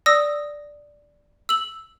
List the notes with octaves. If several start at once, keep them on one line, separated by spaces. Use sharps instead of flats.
D5 D#6 E6 A#6
E6 F#7